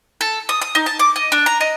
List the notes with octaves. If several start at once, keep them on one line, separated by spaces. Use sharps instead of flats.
A4
D#6
D#6
D#4
A5
D6
D#5
D4
A#5
D#5